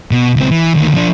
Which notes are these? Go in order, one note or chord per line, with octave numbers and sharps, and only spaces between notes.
B2
C#2 C4
E3
D2 D#3
F3 D4